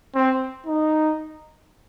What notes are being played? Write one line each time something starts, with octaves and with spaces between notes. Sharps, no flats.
C4
D#4